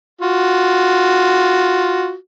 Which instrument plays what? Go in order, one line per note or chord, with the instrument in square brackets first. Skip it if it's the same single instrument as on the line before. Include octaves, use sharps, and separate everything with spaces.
[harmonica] F4 F#4